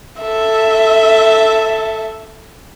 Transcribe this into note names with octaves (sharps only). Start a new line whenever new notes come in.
A4 E5